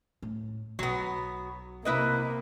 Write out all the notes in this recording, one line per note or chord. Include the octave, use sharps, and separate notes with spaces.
A2
B1 F#3 B3
C3 A#3 E4 B4 D#5